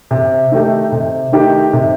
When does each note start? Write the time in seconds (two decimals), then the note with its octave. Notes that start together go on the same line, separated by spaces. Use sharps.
0.11 C3
0.52 D#3 A3 D#4 G4
0.92 C3
1.32 D#3 A3 D#4 G4
1.73 C3